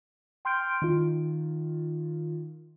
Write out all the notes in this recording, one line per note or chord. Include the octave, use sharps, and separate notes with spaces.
G5 C6 F6 G6 D7
D#3 F4